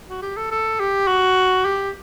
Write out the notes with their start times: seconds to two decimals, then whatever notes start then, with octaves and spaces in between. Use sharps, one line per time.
0.09 F#4
0.22 G4
0.37 A4
0.51 A4
0.80 G4
1.08 F#4
1.65 G4